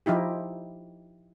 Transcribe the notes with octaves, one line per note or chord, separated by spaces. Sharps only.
F3 D#4 E4 G4